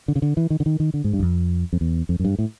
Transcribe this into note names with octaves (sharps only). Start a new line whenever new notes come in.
D3
C#3
D3
E3
D#3
D3
D#3
D#3
D3
G#2
G2
E2
F2
F2
E2
F2
F#2
G2
A2